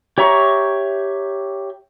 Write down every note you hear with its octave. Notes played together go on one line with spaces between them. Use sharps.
G4 C#5 E5 A#5 C#6